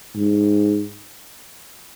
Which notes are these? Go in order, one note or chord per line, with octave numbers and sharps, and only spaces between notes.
G#2